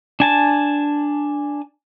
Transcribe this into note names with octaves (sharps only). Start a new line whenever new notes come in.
D4 G#5 A5